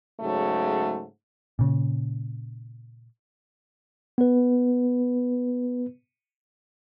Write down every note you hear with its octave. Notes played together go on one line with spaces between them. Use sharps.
G#2 C#3 F#3 A3
A#2 C#3
B3 B4